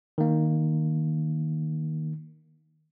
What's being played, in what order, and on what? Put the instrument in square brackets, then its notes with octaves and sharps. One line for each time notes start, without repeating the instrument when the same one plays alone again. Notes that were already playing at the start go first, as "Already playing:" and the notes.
[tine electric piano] D#3 A#3